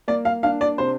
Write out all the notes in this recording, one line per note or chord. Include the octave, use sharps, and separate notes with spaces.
A#3 D5
F5
D4 F5
D5
C3 C5